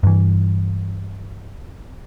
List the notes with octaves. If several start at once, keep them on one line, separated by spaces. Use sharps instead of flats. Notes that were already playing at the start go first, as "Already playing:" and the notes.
G2 E3